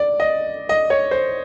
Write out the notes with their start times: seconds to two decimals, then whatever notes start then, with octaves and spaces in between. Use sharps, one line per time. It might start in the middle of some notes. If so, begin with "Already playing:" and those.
Already playing: D5
0.20 D#5
0.69 D#5
0.90 C#5
1.11 C5